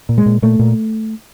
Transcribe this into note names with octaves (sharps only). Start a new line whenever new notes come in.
A#2
G#3
A#2
A#2 A3
A#2